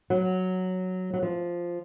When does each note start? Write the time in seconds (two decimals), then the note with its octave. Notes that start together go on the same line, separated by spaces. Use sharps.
0.10 F#3
1.14 F#3
1.22 F3